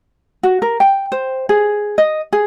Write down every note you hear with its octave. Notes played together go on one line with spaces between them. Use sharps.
F#4
A#4
G5
C5
G#4
D#5
G#4